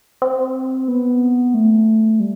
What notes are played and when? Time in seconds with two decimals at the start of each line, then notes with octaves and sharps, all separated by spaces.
0.22 C4
0.88 B3
1.54 A3
2.20 G3